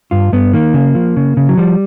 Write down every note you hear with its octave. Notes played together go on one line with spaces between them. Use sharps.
G2 F4
G2 B3
D#3 A#3
C#3
F3
C#3
C#3
F#3
F3 G3